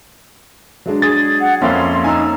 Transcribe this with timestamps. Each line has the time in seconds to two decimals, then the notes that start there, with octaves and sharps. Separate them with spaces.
0.86 F#3 G#3 D4
1.02 G#4 A6
1.41 F#5
1.62 F2 A#3 C#4 E5 F5 C6
2.04 D#4 G#5 A#5 E6